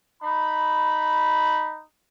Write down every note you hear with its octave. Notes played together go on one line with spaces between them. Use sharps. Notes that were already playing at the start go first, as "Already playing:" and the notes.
D#4 B5